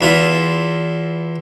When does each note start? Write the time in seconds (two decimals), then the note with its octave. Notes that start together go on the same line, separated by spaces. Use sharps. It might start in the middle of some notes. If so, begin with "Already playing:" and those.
0.01 E2 E4 F4